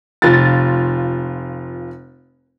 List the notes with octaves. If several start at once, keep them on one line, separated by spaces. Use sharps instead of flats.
F1 F4 A6